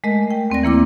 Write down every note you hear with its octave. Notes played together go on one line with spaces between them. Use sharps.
G#3 A3 A#4 D#5
G5
D#2 C4 D5 A#6
E3 A#3 E4 D6